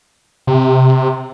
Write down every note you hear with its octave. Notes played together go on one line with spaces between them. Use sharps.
C3